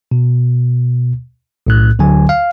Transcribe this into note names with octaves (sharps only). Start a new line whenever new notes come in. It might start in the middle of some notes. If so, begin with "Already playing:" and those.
B2
B1 A2 F#6
D2 D3 F#3 G#5
F5